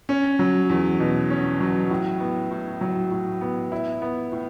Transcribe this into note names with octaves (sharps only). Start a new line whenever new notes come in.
C#4
F#3
E2
B2
C#4
F#3
A2
B3
A2
F#3
A2
B3
E4
B3
A2